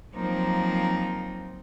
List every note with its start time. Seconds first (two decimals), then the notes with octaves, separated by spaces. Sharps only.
0.14 F3 F#3 A#3 C4 D#4